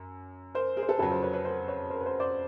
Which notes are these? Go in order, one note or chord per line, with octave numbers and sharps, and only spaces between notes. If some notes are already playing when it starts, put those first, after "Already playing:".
Already playing: F#2
A#4 C5
G#4 A#4
C5
A4 B4
F2 C#3 F#3 A4 B4
A#4 C5
B4 C#5
B4 C#5
A#4 C5
B4 C#5
A#4 C5
B4
A#4 C5
C5 D5